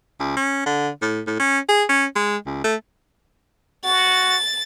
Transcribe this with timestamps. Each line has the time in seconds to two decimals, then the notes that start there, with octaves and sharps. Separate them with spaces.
0.20 C#2
0.37 C#4
0.66 D3
1.02 A2
1.27 A2
1.40 C#4
1.69 G#4
1.89 C#4
2.15 G#3
2.46 C#2
2.64 A3
3.84 F#4 A6